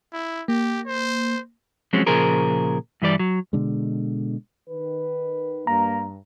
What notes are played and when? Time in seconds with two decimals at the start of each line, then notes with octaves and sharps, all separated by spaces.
0.13 E4
0.48 A#3 G4
0.86 C5
1.93 F3 F#3 G#3 C4 C#4
2.06 A#2 C#3 F3 G#4 A#4 C5
3.02 G2 E3 G3 D5
3.19 F#3
3.53 B2 D3 G#3
4.69 D#3 B4
5.67 G2 A#3 A#5